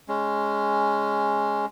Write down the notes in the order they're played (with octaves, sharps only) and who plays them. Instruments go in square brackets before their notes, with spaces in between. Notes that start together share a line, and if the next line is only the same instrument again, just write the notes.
[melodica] G#3 C#4